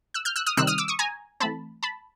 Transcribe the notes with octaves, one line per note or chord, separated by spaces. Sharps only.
E6 F#6
F6 G6
E6 F#6
D#6 F6
C3 D#3 G3 C4 D#4 E6 F#6
D#6 F6
D6 E6
C#6 D#6
G#5 A#5
E3 A3 C4 A5 B5
A5 B5